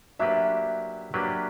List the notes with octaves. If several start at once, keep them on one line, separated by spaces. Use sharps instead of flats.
F#3 A#3 D4 G4 B4 E5
F#3 A#3 D4 G4 B4